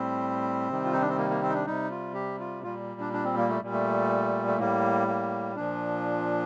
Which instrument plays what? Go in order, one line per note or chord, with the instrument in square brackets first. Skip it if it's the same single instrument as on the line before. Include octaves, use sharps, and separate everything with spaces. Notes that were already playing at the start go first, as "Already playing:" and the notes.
Already playing: [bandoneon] A2 G3 C4
C3 D#3 G3
F4
D#4
D4
C4
A#3
A#3
C4
D#4
D4
C3 G3 D#4
F4
G4
F4
A#2 G3 F4
D4
D4
C4
A#3
A3
A#2 G3
A3
A3
A2 G3 A#3
A#3
A#2 F3 D4